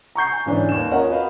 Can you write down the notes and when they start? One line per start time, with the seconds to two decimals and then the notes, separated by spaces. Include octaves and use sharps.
0.15 A#5 C#6 G6 C7
0.32 G#5
0.46 G#2 D3 E3 C#4 D4
0.69 D#2 E7
0.91 C#4 F4 A#4 C#5 D#5 F#5
1.10 F#4 A#4 B4 D#5 F5